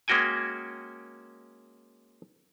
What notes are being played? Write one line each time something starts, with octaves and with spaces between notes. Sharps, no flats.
G#3 A#3 C#4 F#4 G5 G#5